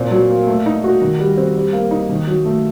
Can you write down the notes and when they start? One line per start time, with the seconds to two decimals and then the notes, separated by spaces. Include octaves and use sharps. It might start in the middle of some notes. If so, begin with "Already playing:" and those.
Already playing: A#2 C4
0.11 F#3
0.30 A#3
0.47 A3
0.66 D#4
0.84 F#4
1.01 D#3
1.19 G3
1.37 C4
1.56 G3
1.73 A#3
1.91 D#4
2.09 D#3
2.28 F#3
2.45 A3